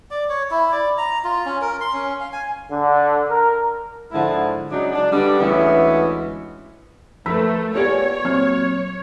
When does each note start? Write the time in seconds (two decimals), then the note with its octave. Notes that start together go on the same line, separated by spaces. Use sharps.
0.11 D5
0.29 C#5
0.51 E4
0.72 D5
0.98 A#5
1.24 F4
1.46 C#4
1.62 A#4
1.81 C6
1.94 C#4
2.20 F5
2.33 G#5
2.71 D3
3.29 A#4
4.11 G#2 D3 F3 E4
4.71 C#3 F#3 G#3 D4 D#4
4.92 D4
5.12 D3 G3 B3 D4
5.39 D2 E3 G#3 B3 C#4 E5
7.26 F3 A3 A#4 B4 B5 E6 B6
7.75 B3 F4 G4 A#4 C#5 D5 G#5
8.25 A#2 F#3 C4 F6